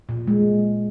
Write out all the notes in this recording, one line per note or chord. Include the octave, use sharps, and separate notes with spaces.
A#2
G#3